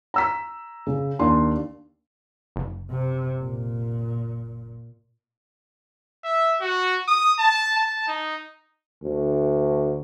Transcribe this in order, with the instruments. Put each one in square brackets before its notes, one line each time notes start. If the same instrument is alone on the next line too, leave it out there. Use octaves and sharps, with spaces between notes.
[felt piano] A#5 E6 B6
C#3
D#2 D4 C6
[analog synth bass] F#1
[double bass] C3
A#2
[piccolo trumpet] E5
F#4
D#6
A5
A5
D#4
[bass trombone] D2